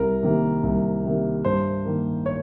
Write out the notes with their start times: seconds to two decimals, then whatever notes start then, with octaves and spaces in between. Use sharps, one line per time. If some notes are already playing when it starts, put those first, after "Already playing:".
Already playing: C2 A#4
0.23 C3 D#3 A#3
0.63 C2
1.04 C3 D#3 A#3
1.45 G2 C5
1.85 D#3 A#3
2.26 C#5